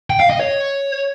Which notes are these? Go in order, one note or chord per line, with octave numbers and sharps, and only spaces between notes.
G5
F5
D#5
C#5